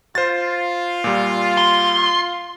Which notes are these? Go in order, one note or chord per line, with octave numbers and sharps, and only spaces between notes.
F4 C5 A6
A#2 G3
C6